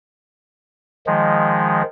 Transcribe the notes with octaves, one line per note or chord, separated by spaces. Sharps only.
D#3 F3 G#3